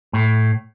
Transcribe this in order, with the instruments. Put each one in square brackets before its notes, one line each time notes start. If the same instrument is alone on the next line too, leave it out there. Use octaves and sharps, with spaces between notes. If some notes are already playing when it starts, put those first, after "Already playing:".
[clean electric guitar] A2